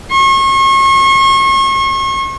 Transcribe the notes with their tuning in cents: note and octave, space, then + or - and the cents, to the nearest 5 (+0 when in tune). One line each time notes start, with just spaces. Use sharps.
C#6 -40